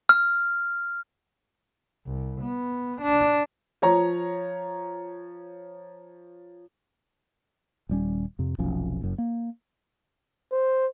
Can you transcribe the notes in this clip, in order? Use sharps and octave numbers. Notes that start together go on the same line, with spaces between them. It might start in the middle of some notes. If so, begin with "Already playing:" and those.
F6
C2
B3
D4
F3 C#5 A#5
D#1 G3 C#4
F2 C3
F1 B1 F3 C#4
F#1 F#2
A#3
C5